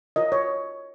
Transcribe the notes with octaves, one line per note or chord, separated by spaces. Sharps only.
F4 A#4 C#5 D#5
C#5